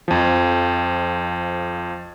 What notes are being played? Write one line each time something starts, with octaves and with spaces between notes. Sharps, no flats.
F2 F3